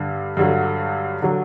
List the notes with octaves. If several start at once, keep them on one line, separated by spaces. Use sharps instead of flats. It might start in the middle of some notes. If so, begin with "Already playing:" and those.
Already playing: G2 D3
G2 D3 F#3
D3 F#3